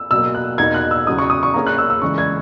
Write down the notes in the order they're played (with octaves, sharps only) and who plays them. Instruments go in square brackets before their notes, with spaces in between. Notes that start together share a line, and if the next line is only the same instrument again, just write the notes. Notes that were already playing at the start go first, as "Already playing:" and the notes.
Already playing: [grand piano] E6
[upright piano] B2 F#3 A#3 [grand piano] E6
[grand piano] F#6
[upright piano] E2 B2 A#3 D#4 [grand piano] G#6
[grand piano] F#6
E6
[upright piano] E2 C#3 F#3 [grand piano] D#6
[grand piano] C#6
D#6
C#6
[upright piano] A#3 C#4 G#4 [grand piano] A#5
[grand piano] F#6
E6
E6
[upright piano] C#3 E3 G#3 [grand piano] C#6
[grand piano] G#6